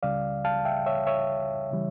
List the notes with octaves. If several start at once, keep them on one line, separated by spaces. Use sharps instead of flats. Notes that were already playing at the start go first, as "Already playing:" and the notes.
C#2 C#3 G3 D5 F5
F5 A5
E5 G5
C#5 E5
C#5 E5
C#3 E3 G3